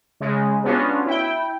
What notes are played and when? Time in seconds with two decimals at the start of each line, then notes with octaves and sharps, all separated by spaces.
0.20 C#3 G#3
0.64 B3 C#4 D4 F4 F#4
1.06 E4 G5